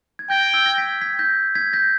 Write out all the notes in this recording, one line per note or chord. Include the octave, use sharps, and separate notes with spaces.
G#6
G5 G6 A#6
E6 G#6
A#6
G#6 B6
G#6 B6
G6 A#6
G#6 B6
G6 A#6